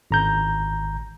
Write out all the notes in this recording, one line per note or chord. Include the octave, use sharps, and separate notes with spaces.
G#1 A#5 G6